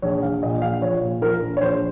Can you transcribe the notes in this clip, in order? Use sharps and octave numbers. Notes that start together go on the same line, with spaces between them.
A#1 C#5
A#1 F5
A#2 D#5
A#1 F5
F3 C#5
A#2
F3 A#4
A#1
C#5
A#1 C5